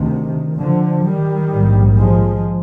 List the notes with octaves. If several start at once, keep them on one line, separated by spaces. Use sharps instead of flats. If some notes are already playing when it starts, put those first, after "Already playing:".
Already playing: D2 C3 D#3
D3 F3
D#3 G3
A#1 G#2
F3 G#3